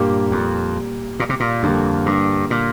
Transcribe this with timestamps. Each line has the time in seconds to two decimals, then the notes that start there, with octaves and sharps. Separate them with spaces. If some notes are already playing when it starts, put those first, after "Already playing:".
Already playing: G2 A#2 G3 A#3 G4 A#4
0.31 F2
1.20 A#2
1.29 C3
1.40 A#2
1.63 F2 D3 G3 A#3
2.06 G2
2.50 A#2